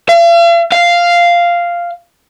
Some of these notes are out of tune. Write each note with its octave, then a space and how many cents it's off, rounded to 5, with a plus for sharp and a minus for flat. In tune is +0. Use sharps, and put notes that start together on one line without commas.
F5 -45
F5 -5